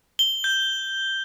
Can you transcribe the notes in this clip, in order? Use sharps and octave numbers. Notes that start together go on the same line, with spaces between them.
G7
G6